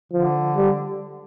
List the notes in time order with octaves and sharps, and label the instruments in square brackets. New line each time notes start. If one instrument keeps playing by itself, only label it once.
[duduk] D3 [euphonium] F3
[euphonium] G3